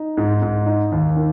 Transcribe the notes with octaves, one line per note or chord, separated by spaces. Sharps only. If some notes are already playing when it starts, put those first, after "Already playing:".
Already playing: D#4
G#2
G#2
D#4
D#2
D#3